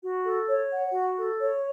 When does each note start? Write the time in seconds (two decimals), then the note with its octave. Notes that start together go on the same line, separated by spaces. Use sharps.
0.03 F#4
0.26 A4
0.49 C#5
0.71 F#5
0.93 F#4
1.17 A4
1.39 C#5